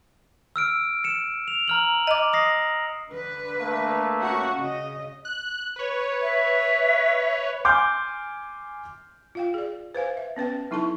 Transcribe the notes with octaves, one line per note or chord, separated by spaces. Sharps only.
E6 F6 D7
C#7 E7
F7
A#5 F6 F#7
D#5 D6
D#6 A#6 C7
D3 B4
A3 A#3
C#4 F#4
C#3 D#5
F#6
B4 C#5
E5
G#5 C6 D6 F6 G6
F4 F5 G5
G#4 D5
B4 C5 F5 G#5
E5
B3 C#4 B4 G5
F#3 D#4 E4 A4 A5 C#6